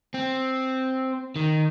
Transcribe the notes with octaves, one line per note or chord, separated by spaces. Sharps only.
C4
D#3